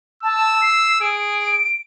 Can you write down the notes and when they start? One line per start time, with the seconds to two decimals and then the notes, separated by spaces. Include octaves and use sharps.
0.23 A5 E6
0.62 C7
1.01 G#4 D7